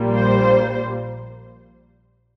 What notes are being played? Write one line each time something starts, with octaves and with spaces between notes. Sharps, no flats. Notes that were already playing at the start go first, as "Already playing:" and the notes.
Already playing: A#1 A#2 G3 A#3
C5